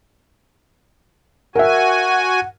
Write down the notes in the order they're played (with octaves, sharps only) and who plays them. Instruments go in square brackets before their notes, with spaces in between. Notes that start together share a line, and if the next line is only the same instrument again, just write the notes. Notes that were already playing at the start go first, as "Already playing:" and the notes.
[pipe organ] F#4 G#5 [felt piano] A#4 E5 [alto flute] F#5